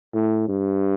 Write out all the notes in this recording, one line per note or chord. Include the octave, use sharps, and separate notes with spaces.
A2
G2